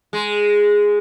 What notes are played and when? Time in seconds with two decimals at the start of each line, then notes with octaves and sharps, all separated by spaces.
0.13 G#3